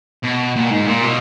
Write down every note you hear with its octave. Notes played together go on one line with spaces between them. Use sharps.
B2
A#2
G#2
A#2
B2